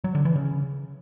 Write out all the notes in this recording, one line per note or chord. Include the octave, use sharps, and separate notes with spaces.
F#3
D3
E3
C#3